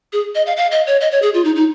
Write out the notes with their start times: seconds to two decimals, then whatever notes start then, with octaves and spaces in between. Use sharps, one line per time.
0.13 G#4
0.35 D#5
0.46 F5
0.57 F5
0.72 D#5
0.87 C#5
1.01 D#5
1.12 C#5
1.22 G#4
1.34 F4
1.45 D#4
1.56 D#4